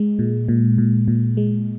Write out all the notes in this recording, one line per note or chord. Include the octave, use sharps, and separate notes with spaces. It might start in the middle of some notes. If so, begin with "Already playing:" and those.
Already playing: G#3
A#2
A#2
A#2
A#2
G#3